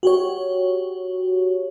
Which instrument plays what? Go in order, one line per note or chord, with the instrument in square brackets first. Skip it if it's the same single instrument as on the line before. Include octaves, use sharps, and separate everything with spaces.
[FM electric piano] F#4 G4 C#5